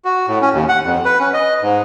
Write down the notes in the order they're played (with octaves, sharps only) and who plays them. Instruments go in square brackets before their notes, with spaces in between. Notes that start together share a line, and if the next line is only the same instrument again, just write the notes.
[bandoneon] F#4
A2
C#4
D#2
F#5
F2
B4
C#4
D#5
G#2